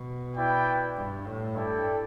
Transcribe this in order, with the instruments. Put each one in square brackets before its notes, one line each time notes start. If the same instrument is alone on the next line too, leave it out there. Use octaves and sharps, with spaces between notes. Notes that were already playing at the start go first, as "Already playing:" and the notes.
Already playing: [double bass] B2
[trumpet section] E4 B4 D5 G5
[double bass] G2
A2
[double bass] G2 [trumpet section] E4 A4 D5 G5